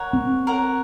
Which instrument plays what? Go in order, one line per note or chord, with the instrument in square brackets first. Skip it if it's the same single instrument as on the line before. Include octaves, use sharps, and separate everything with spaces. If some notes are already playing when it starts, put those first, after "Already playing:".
Already playing: [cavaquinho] A#4 C#5 F#5
[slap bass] C4
[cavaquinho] A#4 C#5 F#5